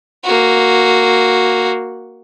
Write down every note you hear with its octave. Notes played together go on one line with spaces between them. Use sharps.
A#3 F#4